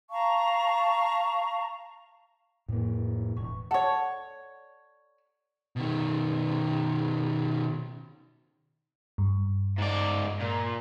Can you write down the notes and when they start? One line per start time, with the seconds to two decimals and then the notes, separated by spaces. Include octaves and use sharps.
0.11 F5 A5 A#5 C#6
2.68 F2 A2 A#3
3.37 E1 C#6
3.71 A4 C#5 D5 F#5
5.76 B2 D#3
9.18 G2
9.78 G#2 D5
10.40 A#2